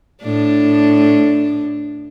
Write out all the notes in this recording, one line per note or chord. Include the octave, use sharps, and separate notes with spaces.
A2 D4